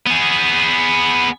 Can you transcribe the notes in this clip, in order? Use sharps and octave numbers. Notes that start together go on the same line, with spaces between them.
B3 G#4